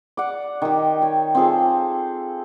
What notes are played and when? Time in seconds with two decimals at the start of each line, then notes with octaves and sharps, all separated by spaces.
0.17 D5 F#5
0.62 D#3 G4
1.02 C#5
1.35 C4 F4 G#4 A4